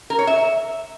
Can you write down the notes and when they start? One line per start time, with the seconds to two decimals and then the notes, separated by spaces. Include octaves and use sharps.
0.10 A#4
0.19 C#5
0.27 E5